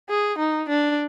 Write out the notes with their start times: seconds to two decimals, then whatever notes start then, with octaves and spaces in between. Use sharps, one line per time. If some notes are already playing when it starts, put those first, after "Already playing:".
0.10 G#4
0.39 D#4
0.69 D4